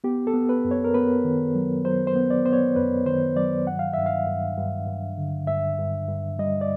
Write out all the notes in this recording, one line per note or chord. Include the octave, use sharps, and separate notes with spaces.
B3 G4
A4
B3
B4
F#2
C#5
A#4
B3 B4
D#3
F#3
F#3 C5
C5
B3
D5
B3 C5
C#5
F#2 B4
D#3 C5
F#3 D5
G2 F#5
F5
G2 E5
F5
G2
G2
G2
D3
G2 E5
G2
G2
G3 D#5
D5